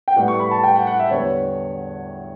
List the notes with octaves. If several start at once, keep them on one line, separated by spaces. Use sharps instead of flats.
G5
A2 G3 B3 F#5
C#6
B5
A5
G5
F#5
F#5
E5
E2 D3 G3 B3 C#5